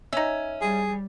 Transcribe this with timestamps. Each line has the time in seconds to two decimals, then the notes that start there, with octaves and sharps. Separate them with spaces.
0.13 C#4 D#4 E5
0.61 G3 G#4